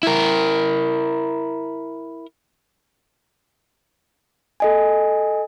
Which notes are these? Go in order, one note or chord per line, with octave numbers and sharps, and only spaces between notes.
E4 A#4
A4 D#5 G#5